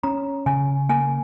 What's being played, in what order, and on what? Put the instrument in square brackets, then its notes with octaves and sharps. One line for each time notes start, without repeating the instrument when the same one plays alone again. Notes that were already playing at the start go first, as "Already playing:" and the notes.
[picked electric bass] C#4 [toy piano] A#5
[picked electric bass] C#3 [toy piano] G#5
[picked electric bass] A#3 [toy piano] G#5